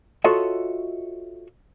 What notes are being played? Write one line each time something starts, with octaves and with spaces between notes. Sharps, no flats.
F4 F#4 A4 C#5 D#5 E5